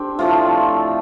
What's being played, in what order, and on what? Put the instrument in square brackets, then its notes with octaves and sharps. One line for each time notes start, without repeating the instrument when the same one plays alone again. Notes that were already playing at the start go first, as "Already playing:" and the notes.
Already playing: [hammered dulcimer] C4 D4 G4 A4
A2 F3 A3 F4